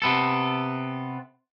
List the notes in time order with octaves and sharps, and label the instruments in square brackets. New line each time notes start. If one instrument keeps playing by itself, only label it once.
[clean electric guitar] C3 B3 A4